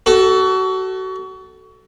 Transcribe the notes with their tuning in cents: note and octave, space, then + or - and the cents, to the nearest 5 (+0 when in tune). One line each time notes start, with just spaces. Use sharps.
F#4 +30 A4 +0